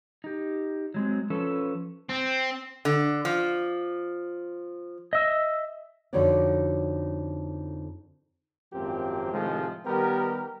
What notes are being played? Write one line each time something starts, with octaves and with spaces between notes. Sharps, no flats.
D#4 G4
F#3 G#3 C4
F3 C#4 A4 B4
C4
D3
F3
D#5 E5
F2 D3 D#4 F#4 C#5 D5
G#1 F#2 F3 A#3 C4 G4
A2 C3 D#3 F3 G#3
D#3 G3 B3 G4 A#4